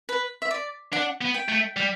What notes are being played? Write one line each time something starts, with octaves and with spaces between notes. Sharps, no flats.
B4
E5
D5
D4 F#5
B3
G5
A3
G3